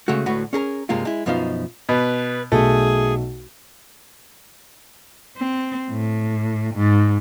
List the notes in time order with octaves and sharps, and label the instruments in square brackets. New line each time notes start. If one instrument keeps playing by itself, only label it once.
[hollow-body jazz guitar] C#3 G#3 A3 F#4
D2 A2 F#4 B4
C#4 G#4 A#4 A#5
G2 C3 G#3 A#3 F4
G#3 E4
F#2 B2 F3 B3 D#4 F5
[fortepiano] B2 [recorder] B4
[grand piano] B1 [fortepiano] A3 [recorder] G#4
[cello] C4
A2
G#2